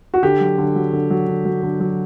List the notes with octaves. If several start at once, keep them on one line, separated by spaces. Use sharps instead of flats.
F#4
D3 G4
F#3
D3
F#3
D3
F#3
D3
F#3
D3
F#3